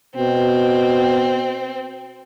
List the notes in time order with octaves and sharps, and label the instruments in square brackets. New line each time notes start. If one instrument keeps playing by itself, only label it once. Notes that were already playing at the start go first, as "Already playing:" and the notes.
[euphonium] B2 [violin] C4